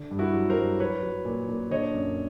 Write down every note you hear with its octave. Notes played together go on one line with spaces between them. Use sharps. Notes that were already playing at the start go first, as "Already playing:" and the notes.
Already playing: D3
G2
E4 F#4
F#3
A#4 C5
G2
F#3 B4 C#5
F#3
A#2
A#2
D3 C#5 D#5
F#2